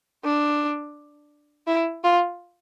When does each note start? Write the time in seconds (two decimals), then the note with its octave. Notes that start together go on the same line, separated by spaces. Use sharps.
0.24 D4
1.67 E4
2.04 F4